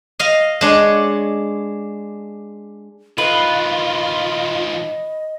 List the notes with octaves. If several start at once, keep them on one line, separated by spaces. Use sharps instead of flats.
D#5 F5
G#3 D4 C#5
D#3 F3 F4 B4 D#5